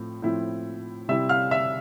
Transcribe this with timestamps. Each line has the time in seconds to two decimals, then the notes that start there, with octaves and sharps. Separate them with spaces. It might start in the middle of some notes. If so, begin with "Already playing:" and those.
Already playing: A2 F3 C4
0.22 A2 F3 C4 E4
1.08 C3 G3 C4 E4 E5 E6
1.29 F5 F6
1.51 E5 E6